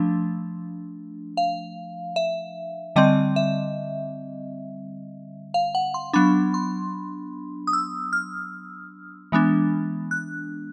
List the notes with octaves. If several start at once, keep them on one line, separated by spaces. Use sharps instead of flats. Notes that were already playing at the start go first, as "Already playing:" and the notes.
Already playing: F3 A3 D4
F5
E5
D3 G3 C4 D#5
E5
F5
F#5
C6
F#3 B3 D4 B5
C6
D#6
E6
F6
E3 G#3 B3 D4
F#6